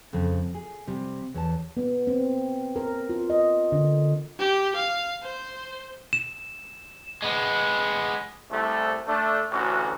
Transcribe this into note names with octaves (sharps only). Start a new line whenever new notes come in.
F2 C#3
G#4
C3 G3
E2 C#5 A5
B3
C4
A#4
F4
D#5
D3
G4
F5
C5
E7
G#3 B3
C2 A3
A3 D4
A1 D2 C#4 F#4